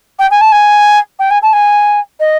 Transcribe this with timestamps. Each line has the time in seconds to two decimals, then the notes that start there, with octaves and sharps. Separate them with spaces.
0.19 G5
0.30 G#5
0.41 A5
0.52 G#5
1.19 G5
1.30 G#5
1.42 A5
1.53 G#5
2.19 D#5